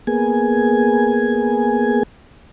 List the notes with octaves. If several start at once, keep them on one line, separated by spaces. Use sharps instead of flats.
A#3 B3 G#4 G#5